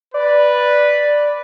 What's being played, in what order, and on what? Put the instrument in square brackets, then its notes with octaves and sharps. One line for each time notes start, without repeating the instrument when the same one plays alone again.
[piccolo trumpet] B4 [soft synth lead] D5